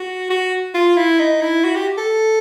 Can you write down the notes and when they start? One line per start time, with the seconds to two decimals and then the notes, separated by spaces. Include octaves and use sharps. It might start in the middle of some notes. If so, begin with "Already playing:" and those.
Already playing: F#4
0.30 F#4
0.75 F4
0.97 E4
1.19 D#4
1.42 E4
1.65 F#4
1.75 G4
1.97 A4